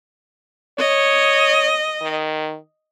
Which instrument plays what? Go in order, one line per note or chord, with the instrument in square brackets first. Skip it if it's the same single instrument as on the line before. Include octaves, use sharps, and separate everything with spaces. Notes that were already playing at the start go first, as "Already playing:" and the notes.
[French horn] C#5 [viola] D#5
[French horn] D#3